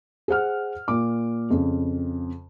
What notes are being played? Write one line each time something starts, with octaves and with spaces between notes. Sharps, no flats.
G#4 C5 F#5 F6
A#2 D6
F2 C#3